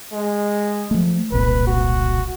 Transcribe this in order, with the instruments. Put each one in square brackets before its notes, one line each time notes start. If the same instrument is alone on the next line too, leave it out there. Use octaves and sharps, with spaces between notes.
[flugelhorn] G#3
[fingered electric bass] F3 A3
[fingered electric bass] E1 C2 A#2 [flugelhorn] B4
[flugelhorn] F#4